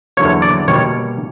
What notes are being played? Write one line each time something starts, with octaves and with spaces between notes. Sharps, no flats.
E2 D3 F#3 A#3 C#5
D5
B2 G3 A#3 C#5